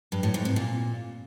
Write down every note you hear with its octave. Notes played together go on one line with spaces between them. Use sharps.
G2
A2
G#2
C3
A#2